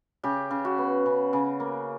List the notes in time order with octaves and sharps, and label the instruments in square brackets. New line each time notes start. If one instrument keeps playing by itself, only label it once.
[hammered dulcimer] C#3 G4
C#3
F#4
B3
C#3
C#3
A#3